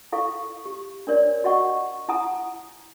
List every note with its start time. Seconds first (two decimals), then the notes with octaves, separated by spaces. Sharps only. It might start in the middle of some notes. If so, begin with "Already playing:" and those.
0.12 E4 A4 F5 C#6
0.65 G4
1.07 D4 A#4 C#5 D5
1.44 F#4 D#5 F#5 C#6
2.09 E4 F#5 G#5 A#5 D#6